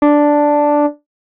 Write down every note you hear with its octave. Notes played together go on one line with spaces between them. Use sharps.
D4